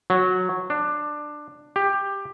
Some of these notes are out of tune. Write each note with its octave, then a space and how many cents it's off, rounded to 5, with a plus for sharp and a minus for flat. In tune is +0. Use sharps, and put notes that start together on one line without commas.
F#3 -10
D4 +15
G4 +15